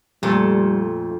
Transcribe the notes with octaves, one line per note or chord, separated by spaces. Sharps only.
F2 A#2 G3 A3 A4